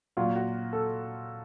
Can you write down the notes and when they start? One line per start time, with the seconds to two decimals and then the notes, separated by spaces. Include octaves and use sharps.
0.17 A#2 F#3 F4
0.35 F#4
0.73 A4